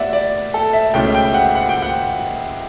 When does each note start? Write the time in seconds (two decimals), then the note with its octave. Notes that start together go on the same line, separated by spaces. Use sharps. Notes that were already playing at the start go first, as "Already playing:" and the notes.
Already playing: A2 G3 B3 D5 E5 F#5
0.13 D5
0.54 A4
0.73 E5
0.94 C#2 B2 A3 C#4 E4 G5
1.15 G5
1.34 F#5
1.55 F#5
1.69 G5
1.82 F#5